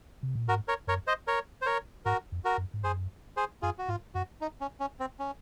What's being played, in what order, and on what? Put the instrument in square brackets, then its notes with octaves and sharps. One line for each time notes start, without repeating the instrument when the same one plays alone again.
[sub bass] C3
A#2
[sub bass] G#2 [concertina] F#4 A#4
[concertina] A#4 C#5
[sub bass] F#2 [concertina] A#4 C#5
[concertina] C5 D#5
A#4 C#5
C5
A#4 C#5
[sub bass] G#2 [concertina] F#4 A#4
[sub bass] F2
[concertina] F#4 A#4
[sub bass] F#2
G#2
[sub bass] F#2 [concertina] G#4 C5
[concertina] G#4 C5
[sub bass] F#2 [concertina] F4 G#4
[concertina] F#4
[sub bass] G#2 [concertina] F4
[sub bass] F#2 [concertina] F#4
[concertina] D#4
C#4
C#4
C4
C#4